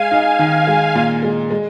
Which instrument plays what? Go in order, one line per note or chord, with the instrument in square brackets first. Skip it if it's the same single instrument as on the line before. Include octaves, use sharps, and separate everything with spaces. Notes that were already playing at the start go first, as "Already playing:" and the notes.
Already playing: [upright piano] G#3 [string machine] F5 G#5
[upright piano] D#4
D#3
G#3
A#2
G#3
G#3